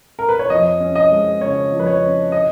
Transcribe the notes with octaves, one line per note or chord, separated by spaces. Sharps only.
A#4
B4
C#5
F2 D#5
C#4
D#5
G#3
C#3 C#5
F2
B4
C#5
C#4
D#5